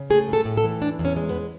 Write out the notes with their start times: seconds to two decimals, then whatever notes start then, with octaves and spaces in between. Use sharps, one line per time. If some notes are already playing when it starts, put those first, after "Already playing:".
Already playing: C#3
0.10 A3 G#4
0.28 A2
0.33 A4
0.45 A2
0.57 A4
0.64 E3
0.81 E2 D4
0.99 E2
1.05 C#4
1.16 G#3
1.29 B3